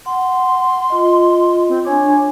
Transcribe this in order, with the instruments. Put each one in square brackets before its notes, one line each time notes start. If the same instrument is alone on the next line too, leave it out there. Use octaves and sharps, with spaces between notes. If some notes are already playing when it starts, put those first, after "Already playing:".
[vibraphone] F#5 [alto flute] C6
[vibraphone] F4 D#5
[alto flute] C4
[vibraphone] D4 G#5 D6 [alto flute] C#5